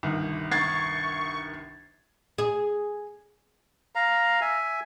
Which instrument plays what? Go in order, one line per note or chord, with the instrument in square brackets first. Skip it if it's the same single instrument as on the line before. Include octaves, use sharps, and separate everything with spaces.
[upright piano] G1 C2 D#3
[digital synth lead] C#6 [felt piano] G#6 A6 C7
[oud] G#4
[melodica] F5 A#5
E5 G#5